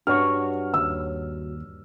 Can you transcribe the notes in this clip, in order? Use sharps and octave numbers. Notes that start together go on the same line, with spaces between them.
G2 F#4 C#5 F#5 F6
D#2 E6